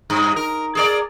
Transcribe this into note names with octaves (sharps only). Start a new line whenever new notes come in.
G2
A#4
G#4 A#4 D5